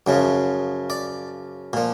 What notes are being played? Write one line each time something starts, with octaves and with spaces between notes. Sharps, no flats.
F#2 C#3 F3
D5
A#2 F3